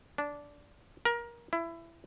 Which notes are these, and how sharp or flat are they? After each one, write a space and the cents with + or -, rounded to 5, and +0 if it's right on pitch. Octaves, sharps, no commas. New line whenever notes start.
D4 -15
A#4 +20
E4 +20